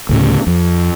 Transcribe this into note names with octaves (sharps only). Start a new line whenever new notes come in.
D2 A2 C#3
F2